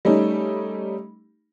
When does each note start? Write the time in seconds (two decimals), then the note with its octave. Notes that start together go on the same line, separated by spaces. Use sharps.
0.05 G3 A3 C#4 D#4